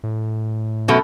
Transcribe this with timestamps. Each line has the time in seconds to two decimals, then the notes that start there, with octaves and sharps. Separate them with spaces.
0.04 A2
0.88 F#2 B2 A3